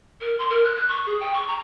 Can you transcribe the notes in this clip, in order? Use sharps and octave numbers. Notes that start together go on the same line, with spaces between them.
A#4
C6
A#4
F#6
F#6
C#6
G#4
G5
C#6
A#5